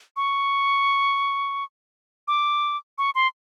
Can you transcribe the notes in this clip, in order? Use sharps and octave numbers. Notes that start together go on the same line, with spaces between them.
C#6
D6
C#6
C6